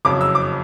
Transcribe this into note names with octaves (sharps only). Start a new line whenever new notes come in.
F#1 F2 C#3 F#3 D6
E6
D6